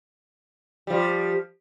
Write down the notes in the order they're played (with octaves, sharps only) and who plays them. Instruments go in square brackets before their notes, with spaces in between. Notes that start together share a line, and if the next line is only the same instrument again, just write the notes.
[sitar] F3 G3